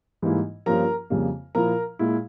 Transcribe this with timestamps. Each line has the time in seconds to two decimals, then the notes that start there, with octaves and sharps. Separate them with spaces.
0.22 G#2 E3 G3 A#3 E4
0.66 G2 F3 A#3 C#4 F4 A#4 A#5
1.10 F2 C#3 G3 A#3
1.55 A#2 F3 A#3 E4 A#4 A#5
1.99 A#2 G#3 E4